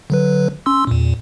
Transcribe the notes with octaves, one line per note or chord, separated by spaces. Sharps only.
D3 F#3 B4
C#4 C6 E6
E2 A#2